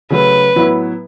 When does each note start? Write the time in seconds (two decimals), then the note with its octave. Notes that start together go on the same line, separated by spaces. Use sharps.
0.10 C#3 F#3 A3 C#4 B4
0.56 A2 F#3 B3 E4